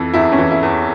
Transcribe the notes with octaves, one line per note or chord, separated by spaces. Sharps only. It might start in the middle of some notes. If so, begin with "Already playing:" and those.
Already playing: F2 E3
E2 E4
C#4
E3
E4
E2